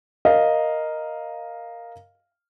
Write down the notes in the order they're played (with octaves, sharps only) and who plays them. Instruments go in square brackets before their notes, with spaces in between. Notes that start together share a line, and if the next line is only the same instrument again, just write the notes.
[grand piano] A#4 D#5 F5